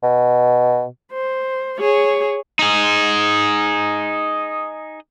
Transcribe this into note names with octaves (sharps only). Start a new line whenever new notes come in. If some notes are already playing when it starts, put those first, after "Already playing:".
B2
C5
G#4 C#5
D#4 G#4